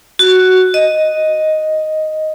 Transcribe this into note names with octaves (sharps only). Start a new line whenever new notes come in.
F#4
D#5